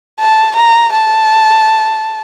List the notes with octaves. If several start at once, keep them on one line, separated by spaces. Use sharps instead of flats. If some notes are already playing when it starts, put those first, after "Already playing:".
A5
A#5
A5